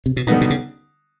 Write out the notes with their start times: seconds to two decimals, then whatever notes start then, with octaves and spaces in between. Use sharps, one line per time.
0.06 C3
0.17 B2
0.27 A#2 D3 G3 B3 D#4
0.41 B2
0.50 C#3